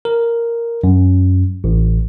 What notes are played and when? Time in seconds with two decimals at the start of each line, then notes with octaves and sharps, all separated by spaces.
0.05 A#4
0.84 F#2
1.64 A1